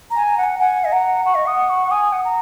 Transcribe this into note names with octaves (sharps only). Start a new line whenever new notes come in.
A#5
G#5
A#5
F#5
G#5
F#5 G#5
D#5 G#5
F#5 A#5
F#5 C#6
D#5
F#5 D#6
C#6
G#5 D#6
F#5
A#5